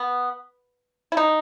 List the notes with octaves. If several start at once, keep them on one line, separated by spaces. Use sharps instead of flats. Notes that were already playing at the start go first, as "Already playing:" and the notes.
Already playing: B3
E4
D#4